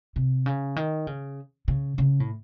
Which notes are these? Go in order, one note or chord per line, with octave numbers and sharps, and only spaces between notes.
C3
C#3
D#3
C#3
C#3
C#3
A2